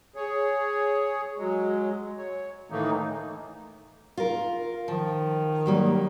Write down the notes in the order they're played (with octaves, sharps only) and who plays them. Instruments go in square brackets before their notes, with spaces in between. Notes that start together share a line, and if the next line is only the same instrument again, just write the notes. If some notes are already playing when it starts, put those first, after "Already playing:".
[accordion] G#4 C#5
F#3 G#3
C#5
A2 D#3 E3 A3 A#3 D#4
[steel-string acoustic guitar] F4 A#4
[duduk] D#3 [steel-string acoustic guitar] F3
[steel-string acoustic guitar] F#3 G3 A#3